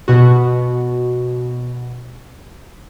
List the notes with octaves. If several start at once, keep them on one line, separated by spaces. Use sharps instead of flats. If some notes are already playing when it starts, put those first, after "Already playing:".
B2 F#4